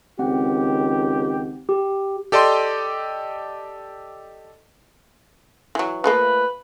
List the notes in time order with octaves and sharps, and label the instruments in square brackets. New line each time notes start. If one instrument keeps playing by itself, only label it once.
[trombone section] C#2 D#3 G4 [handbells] C4 F#5
[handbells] G4
[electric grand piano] G4 A4 D5 D#5 C6
[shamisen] E3 F#3
[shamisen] F3 A3 A#3 [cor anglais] B4